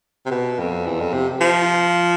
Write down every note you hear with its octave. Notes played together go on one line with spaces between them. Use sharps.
C3
B2
F2
E2
F2
C3
F3